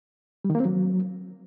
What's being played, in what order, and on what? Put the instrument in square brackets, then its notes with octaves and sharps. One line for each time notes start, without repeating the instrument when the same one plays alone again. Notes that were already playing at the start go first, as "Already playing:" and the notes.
[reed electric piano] G3
D#3
A#3
C4
F#3